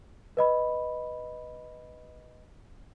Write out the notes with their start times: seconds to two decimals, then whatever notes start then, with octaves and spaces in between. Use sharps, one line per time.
0.37 B4 D#5 B5